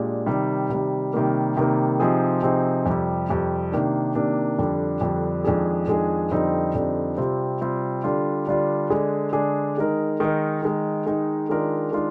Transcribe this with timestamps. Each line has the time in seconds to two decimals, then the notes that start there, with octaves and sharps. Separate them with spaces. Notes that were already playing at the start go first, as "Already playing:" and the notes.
Already playing: A#2 G#3 D4 G4
0.26 C3 D#3 G3
0.70 C3 D#3 G3
1.13 C3 D#3 G3 A#3
1.57 C3 D#3 G3 A#3
2.00 C3 F3 C4 D#4 G#4
2.43 C3 F3 C4 D#4 G#4
2.86 F2 C3 G3
3.29 F2 C3 G3
3.72 C3 D#3 A#3 D4
4.15 C3 D#3 A#3 D4
4.59 F2 D3 G3 D4
5.01 F2 D3 G3 D4
5.44 F2 D#3 G#3 D4 G#4
5.88 F2 D#3 G#3 D4 G#4
6.31 F2 D3 G3 C4 D#4
6.75 F2 D3 G3 C4 D#4
7.17 C3 G3 C4 F4
7.61 C3 G3 C4 F4
8.04 D3 G3 D4 F4
8.47 D3 G3 D4 F4
8.90 D3 G#3 D4 G#4
9.33 D3 G#3 D4 G#4
9.77 D#3 G#3 D#4 A#4
10.20 D#3 G#3 D#4 A#4
10.63 D#3 G#3 D#4
11.06 D#3 G#3 D#4
11.49 D#3 G#3 D4 F4 A#4
11.92 D#3 G#3 D4 F4